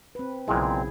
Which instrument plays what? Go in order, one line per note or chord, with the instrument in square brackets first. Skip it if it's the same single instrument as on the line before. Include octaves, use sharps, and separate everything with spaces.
[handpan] C4 B4
[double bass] B1 C#3 [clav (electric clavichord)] A#2 G#3 [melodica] C4 [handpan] E4 G#4